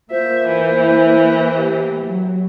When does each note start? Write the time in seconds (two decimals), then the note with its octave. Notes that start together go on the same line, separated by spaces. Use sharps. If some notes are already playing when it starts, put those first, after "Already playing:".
0.11 A#3 F4 C5 E5
0.48 E3
0.82 E4
1.58 G4
2.03 F#3